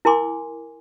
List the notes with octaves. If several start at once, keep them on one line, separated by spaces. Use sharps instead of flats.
E4 A#4 G#5 C6 D6